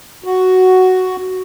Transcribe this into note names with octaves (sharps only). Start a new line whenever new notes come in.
F#4